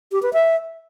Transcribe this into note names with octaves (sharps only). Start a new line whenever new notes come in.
G4
B4
E5